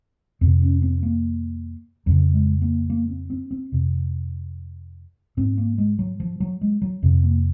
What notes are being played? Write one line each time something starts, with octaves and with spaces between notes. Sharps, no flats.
F2 C3 C4
C#4
C4
A#3
F2 C#3 F#3
G#3
A#3
A#3
C4
C4
C4
F2 C3
G#2 C4
A#3
G#3
F#3
F3
F#3
G#3
F#3
F2 C3
A#3